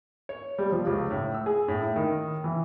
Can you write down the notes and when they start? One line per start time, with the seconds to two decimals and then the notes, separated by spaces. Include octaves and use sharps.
0.29 C#5
0.58 G3
0.72 F3
0.86 C#2
1.11 A2
1.34 E6
1.46 G#4
1.68 A2
1.82 E4
1.96 D#3
2.44 E3